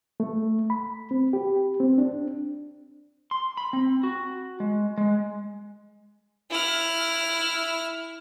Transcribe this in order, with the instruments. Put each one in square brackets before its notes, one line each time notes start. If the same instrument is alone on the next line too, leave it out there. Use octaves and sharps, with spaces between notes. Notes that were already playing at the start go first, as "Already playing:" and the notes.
[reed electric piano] A3
B5
C4
G4
C4
D4
[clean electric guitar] C6
B5
C4
F#4
G#3
G#3
[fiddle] E4 F6